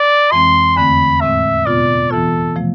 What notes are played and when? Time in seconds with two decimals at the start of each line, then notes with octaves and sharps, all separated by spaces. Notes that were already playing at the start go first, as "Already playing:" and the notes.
Already playing: D5
0.31 F2 E3 G#3 C4 C6
0.76 E2 D3 A3 C4 B5
1.21 A2 G#3 C4 E5
1.66 B2 B3 F4 D5
2.10 E3 B3 F4 A4
2.56 C3 F3 A3